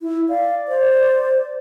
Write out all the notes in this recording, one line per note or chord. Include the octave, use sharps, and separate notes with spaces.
E4
D5 F5
C5